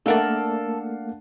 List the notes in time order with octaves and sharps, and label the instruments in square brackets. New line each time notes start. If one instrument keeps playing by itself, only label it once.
[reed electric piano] A3 A#3 [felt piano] D4 F5 F#5 [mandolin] A4 A#4 D5